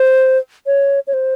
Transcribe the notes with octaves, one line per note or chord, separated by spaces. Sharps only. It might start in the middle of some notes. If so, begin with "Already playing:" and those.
Already playing: C5
C#5
C#5
C5